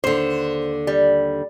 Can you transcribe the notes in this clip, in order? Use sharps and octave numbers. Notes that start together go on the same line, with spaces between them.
D#2 D3 C5
G3